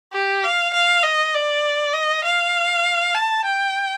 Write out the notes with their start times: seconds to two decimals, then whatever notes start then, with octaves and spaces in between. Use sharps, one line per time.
0.13 G4
0.44 F5
0.74 F5
1.03 D#5
1.34 D5
1.94 D#5
2.24 F5
3.15 A5
3.45 G5